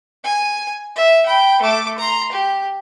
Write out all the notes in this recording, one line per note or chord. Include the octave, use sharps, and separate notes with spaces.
G#5
E5
G5 B5
A3 D6
A#5 C6
G4